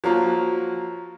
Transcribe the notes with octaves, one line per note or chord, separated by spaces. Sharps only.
F3 F#3 A#3